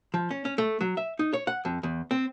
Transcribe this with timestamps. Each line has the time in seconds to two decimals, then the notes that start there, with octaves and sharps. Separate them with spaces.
0.14 F3
0.31 C#4
0.45 C#4
0.58 A3
0.81 F#3
0.97 E5
1.19 D#4
1.33 C#5
1.47 F#5
1.65 F2
1.83 E2
2.11 C4